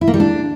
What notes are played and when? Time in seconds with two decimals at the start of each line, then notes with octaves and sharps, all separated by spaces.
0.01 E4
0.08 A#3
0.14 G3
0.20 D4